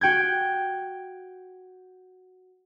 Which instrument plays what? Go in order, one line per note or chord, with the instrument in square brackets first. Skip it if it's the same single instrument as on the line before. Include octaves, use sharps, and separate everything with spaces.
[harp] F#4 G5 G6 G#6